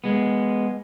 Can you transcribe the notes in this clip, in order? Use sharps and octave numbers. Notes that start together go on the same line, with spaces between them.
G#3 B3